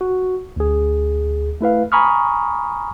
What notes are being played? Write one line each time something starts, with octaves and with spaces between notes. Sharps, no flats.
F#4
D2 G#4
A3 E4 B4 F5
G#5 A#5 B5 C#6 D#6 F6